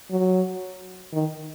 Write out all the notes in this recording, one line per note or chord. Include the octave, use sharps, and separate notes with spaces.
F#3
D#3